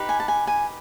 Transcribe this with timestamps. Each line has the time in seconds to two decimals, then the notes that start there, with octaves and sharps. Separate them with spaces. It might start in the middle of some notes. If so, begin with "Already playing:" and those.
Already playing: D#4 G4 B4
0.09 G#5
0.20 A5
0.28 G#5
0.47 G#5